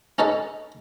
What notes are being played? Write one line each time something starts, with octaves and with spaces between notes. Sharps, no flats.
C#4 D#4 A4 B4 D#5